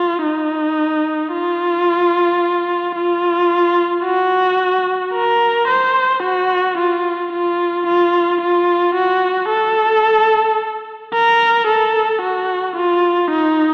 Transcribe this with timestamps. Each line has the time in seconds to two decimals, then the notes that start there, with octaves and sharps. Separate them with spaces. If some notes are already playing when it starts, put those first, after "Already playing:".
Already playing: F4
0.23 D#4
1.33 F4
2.96 F4
4.04 F#4
5.14 A#4
5.68 C5
6.23 F#4
6.78 F4
7.32 F4
7.86 F4
8.41 F4
8.95 F#4
9.49 A4
11.14 A#4
11.67 A4
12.22 F#4
12.76 F4
13.31 D#4